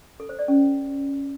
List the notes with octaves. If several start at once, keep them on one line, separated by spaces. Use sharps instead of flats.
A4
C5
D5
C#4